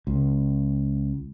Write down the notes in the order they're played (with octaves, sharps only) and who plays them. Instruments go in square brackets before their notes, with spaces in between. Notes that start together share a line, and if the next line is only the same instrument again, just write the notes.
[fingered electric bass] C#2